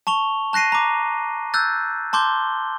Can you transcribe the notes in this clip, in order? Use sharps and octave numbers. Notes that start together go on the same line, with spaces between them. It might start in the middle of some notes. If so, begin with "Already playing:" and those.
A5 C#6 F7 G7
A5 F#6 A#6 C7 D#7
A#5 D6
E6 F#6 G6 A6
A5 C6 D6 G6 G7